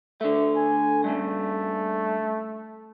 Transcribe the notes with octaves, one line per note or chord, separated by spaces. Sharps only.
D3 A3 E5
G#5
G2 C#3 A3